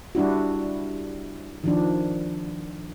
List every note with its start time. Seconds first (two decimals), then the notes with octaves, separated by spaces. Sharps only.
0.15 G3 D4 E4 F#4
1.64 D#3 F3 D4